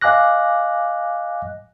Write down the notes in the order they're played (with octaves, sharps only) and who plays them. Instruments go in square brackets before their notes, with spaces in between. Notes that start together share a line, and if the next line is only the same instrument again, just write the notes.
[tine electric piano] D#5 F5 G#5 D6 F#6 A#6